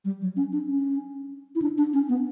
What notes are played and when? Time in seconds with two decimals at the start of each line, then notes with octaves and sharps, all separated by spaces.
0.05 G3
0.21 F#3
0.36 C#4
0.52 D4
0.68 C#4
1.55 E4
1.62 D4
1.78 D4
1.93 C#4
2.09 B3